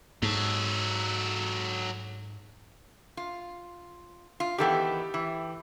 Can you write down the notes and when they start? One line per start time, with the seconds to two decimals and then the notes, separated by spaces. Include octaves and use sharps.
0.23 G#2 F#3 A4
3.17 F4
4.40 F4
4.58 D#3 E3 B3 G4 A4 G5
5.14 E3